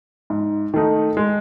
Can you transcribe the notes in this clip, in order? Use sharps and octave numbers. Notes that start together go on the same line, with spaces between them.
G#2
D#3 A3 D#4
G#3